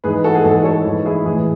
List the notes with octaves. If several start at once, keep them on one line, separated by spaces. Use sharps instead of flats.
G#2 E3 G#4 B4
F#4 A4
G#4
G#2 E3 F#4 A4
A4 C#5
G#2 E3
E4 G#4
A2 E3 G#4 B4